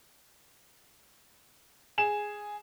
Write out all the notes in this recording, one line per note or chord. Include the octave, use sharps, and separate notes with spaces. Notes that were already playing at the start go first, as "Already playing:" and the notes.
G#4 E7